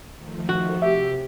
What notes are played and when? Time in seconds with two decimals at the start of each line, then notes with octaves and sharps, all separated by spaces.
0.15 D#3 F3 A3
0.49 F#4
0.82 C3 G4 E5